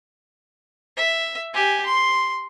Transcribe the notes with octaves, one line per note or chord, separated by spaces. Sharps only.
E5
G4 G#5
C6